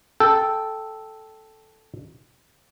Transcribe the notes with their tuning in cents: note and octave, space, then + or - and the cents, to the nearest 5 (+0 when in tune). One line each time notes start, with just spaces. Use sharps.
A4 -5 G5 +0